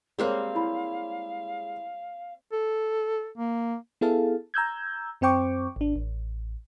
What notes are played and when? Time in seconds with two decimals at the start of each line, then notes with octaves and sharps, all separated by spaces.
0.19 G3 G#3 A#3 C4 G4 A#4 C#5 F5
0.55 E4 B5
2.52 A4
3.37 A#3
4.01 B3 E4 G#4 A4 F5 A5
4.54 A#5 E6 G6 G#6
5.21 F#2 C4 C5 G5 C#6 D6
5.76 G#1 D4
5.96 A1